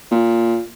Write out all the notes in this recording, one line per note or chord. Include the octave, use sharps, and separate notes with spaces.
A#2